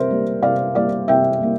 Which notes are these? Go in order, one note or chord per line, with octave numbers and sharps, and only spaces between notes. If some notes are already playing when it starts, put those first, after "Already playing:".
Already playing: C3 G3 A#4 C5 E5
G3 A#3
C3 D5 F5
G3 A#3 D5 F5
C3 E5 G5
G3 A#3